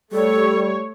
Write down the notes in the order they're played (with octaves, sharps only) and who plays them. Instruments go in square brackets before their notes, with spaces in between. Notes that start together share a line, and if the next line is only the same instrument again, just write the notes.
[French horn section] G3 [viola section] A3 C#5 [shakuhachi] A4